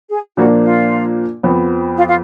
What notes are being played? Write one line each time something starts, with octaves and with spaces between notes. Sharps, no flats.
G#4
A#2 F3 A#3 D4 F#4
F4
F2 F3 B3
F4
F4